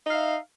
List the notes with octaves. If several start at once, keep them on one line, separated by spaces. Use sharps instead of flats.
D#4 E5 F5